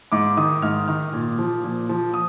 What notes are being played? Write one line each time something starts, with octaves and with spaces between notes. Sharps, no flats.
G#2 D6
D#3 D#6
G#2 F6
D#3 F6
A#2
F3
A#2
F3
D#6